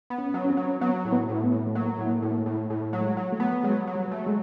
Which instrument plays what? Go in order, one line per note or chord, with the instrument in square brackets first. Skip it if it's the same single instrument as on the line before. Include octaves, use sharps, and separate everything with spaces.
[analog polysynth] B3
[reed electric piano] C#4
[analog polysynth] F#3
[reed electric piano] C#4
C4
[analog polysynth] F#3
[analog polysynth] F#3 [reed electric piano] B3
[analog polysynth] A2
[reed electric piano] B3
[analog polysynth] A2
[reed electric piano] B3
[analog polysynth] A2
[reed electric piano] A3
[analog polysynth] F#3 [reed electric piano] A#3
[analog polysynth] A2
[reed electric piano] A#3
[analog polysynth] A2
[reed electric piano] A#3
A3
[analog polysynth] A2
A2
F#3
[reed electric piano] G#3
[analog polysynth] F#3
[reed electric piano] A3
[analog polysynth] B3
[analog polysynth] F#3 [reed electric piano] G#3
[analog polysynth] F#3
[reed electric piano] G3
[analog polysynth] A3
[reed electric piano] G#3